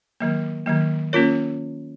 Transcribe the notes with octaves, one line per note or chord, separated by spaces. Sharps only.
D#3 F#3 A#3
D#3 F#3 A#3
A#3 C#4 F4 A#4 C#5